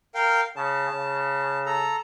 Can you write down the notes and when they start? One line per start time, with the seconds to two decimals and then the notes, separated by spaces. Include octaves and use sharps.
0.15 A#4 F5 G5
0.56 C#3 A5
0.90 C#3
1.66 A4 A#5